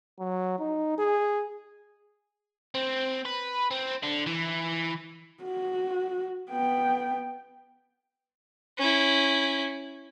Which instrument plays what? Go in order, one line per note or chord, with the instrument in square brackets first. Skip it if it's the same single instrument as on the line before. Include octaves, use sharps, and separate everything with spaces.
[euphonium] F#3
D#4
G#4
[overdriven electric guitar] C4
B4
C4
D3
E3
[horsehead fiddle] F#4
B3 G5
[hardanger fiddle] C#4 E4